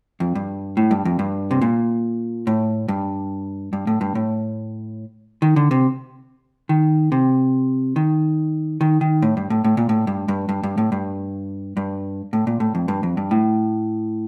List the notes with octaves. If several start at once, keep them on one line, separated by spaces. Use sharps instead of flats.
F2
G2
A2
G2
F2
G2
C3
A#2
A2
G2
G2
A2
G2
A2
D#3
D3
C3
D#3
C3
D#3
D#3
D#3
A2
G2
A2
A2
A#2
A2
G2
G2
G2
G2
A2
G2
G2
A2
A#2
A2
F2
G2
F2
G2
A2